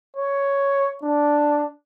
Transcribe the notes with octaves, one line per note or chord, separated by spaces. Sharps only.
C#5
D4